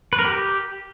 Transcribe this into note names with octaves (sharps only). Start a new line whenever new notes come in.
B4
A#4
G4